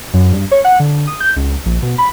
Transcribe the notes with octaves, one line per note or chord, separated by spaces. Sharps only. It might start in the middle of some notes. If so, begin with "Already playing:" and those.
F#2
G2
C#5
F#5
D3
D#6
G6
C#2
A#1
B2
B5